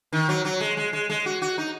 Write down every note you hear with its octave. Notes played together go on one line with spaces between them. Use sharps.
D#3
F#3
F#3
G#3
G#3
G#3
G#3
F#4
F#4
D#4